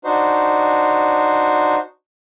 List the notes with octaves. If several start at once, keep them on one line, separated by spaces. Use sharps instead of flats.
D4 D#4 F#4 C5